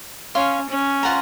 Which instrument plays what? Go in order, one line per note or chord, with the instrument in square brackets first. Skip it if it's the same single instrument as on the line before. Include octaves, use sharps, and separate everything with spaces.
[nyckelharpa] C#4 [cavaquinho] C#5 F5 C6
[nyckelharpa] C#4
[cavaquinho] F4 C5 F#5 A#5